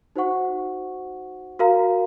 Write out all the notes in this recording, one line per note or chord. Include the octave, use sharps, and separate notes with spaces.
D#4 F#4 C5 F#5 C#6
F#4 A#4 F5 A#5